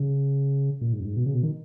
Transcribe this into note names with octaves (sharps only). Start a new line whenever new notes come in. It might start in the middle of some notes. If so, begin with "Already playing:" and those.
Already playing: C#3
A#2
G#2
F#2
G#2
B2
C#3
B2
D#3